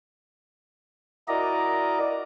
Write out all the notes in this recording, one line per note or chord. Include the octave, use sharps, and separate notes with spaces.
E4 F#4 A#4 D5 D#5 A#5